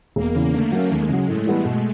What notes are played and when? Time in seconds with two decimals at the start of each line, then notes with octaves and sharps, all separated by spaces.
0.16 E1 A#3
0.35 E2 C#3
0.54 D3 A3
0.72 F#3 A#3 C#4
0.90 D#2 G#3
1.09 C#3 F#3
1.27 A2 A3
1.46 E3 G3 B3 E4
1.65 B2